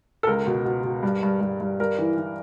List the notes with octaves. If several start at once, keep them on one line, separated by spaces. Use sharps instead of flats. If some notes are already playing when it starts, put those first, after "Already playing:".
A4
C#2 A#4
B2
B2
B2
G2
G2
G2
G2
G2 A#4
E3
E3